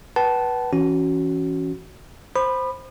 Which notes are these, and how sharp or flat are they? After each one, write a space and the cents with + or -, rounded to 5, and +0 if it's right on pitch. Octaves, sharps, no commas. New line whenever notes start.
B4 -15 F#5 +45 A5 -15
E3 +0 C#4 +5 F#4 +5
C5 +0 B5 +0 D#6 -45